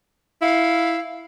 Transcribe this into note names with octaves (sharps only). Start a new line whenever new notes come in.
E4 F5